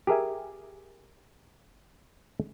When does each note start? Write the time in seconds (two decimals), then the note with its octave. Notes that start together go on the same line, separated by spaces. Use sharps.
0.07 G4 G#4 A#4 E5 G#5